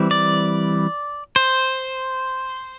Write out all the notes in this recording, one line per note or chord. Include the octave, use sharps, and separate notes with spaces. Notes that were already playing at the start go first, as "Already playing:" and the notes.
Already playing: E3 G3 C4
D5
C5